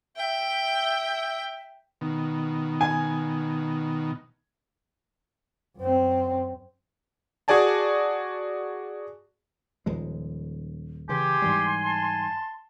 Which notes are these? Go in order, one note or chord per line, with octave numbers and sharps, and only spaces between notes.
E5 G5
B2 D#3
G#5
F#2 C4
F#4 G#4 D5 G#5 A5
D#1 F3 G#3
C#3 E3 G4 G#5 C6
G#2 E3 G3
A5